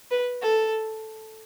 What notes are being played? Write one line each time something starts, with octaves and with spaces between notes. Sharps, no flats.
B4
A4